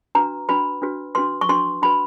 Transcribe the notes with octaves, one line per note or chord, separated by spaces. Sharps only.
D4 F#4 B4 A#5
D4 F#4 B4 B5
D4 F#4 B4
D4 F#4 B4 C6
C#6
D4 F#4 B4 C6
D4 F#4 B4 B5